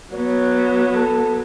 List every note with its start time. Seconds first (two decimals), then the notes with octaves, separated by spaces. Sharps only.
0.14 F#3 B3 C#5
0.94 A4